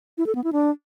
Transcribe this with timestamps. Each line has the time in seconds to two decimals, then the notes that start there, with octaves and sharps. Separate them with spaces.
0.18 E4
0.26 A4
0.35 B3
0.44 E4
0.53 D4